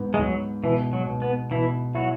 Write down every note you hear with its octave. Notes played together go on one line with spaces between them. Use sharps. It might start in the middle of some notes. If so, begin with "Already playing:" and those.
Already playing: G#2 B3
G#3
G#2 F#3
B2 E3
F#3
B2
B3
B2 E3 E4
F#3 E4 F#4